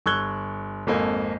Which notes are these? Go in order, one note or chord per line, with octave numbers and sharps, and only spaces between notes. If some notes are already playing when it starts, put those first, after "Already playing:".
G1 C#6 E6 F#6 G#6 G7
G#1 F2 A#3 A4 G#5